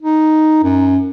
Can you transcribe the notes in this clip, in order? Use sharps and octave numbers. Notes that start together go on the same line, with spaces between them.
D#4
F#2